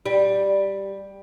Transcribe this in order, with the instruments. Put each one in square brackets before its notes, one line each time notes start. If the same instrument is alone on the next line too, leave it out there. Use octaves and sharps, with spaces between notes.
[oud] G3